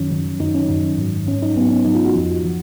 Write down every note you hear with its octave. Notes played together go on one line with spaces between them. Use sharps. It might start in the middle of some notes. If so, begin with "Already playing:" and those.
Already playing: F#2 D#3 F#3 C#4
F#2 D#3 F#3
F#2 D#3 F#3 D#4
C#4
F#2 D#3 F#3
G#2 F#3
G#2 F#3 C#4
D#4
G#2 F#3 B3
C#4
G#2 F#3 D#4
F4
F#4
F2 F3
F3